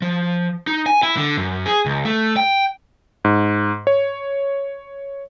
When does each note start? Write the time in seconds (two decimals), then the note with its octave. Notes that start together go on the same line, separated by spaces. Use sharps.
0.02 F3
0.67 D#4
0.86 G#5
1.03 E4
1.17 D3
1.37 F#2
1.66 G#4
1.86 C#2
2.05 A3
2.36 G5
3.25 G#2
3.87 C#5